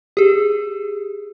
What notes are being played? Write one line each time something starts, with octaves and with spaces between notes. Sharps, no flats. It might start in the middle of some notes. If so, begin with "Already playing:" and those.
G4 G#4